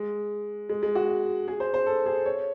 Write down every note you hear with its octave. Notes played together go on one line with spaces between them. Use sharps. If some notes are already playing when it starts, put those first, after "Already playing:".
Already playing: G#3
G#3
G#3
F#4
G#4
C5
C5
A4
G#4
C#5